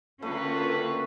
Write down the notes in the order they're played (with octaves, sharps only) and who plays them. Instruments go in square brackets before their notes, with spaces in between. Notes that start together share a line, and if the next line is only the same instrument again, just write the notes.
[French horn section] G2 F#4 B4 [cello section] D3 A#3 C#4 [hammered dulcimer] A3 [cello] F4